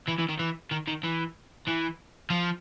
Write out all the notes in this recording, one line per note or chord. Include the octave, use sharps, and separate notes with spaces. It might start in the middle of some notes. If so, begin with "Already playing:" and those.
E3
E3
D#3
E3
D#3
D#3
E3
E3
F3